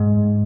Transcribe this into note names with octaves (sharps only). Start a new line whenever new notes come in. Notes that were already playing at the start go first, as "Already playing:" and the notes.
Already playing: G#2